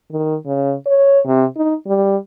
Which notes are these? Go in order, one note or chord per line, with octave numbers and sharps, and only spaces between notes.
D#3
C#3
C#5
C3
D#4
G3